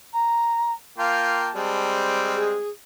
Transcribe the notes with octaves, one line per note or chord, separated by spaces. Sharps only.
A#5
A#3 F4 G5 A5
G3 G#3 C4
G#4